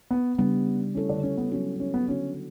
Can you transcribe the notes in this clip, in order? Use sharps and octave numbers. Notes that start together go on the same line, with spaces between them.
B3
C#3 G3 B3 D4
A3 C#4 E4 A4 C#5
D3 D4
C#4
B3
F#3 B3 C#4 F#4
C#4
B3
D3 G3 B3 C#4 D4 F#4